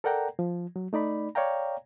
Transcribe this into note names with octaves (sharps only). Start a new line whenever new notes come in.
A4 A#4 D5 F#5 G5 A#5
F3
F#3
A3 D#4 D5 B5
C#5 D5 F5 G5 A#5